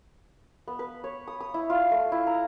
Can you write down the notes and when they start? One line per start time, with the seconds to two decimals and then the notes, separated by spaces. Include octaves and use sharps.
0.67 B3
0.79 B4
1.04 C#5
1.28 D#6
1.40 D#6
1.54 E4
1.70 F4
1.91 A3
2.12 E4
2.27 A#5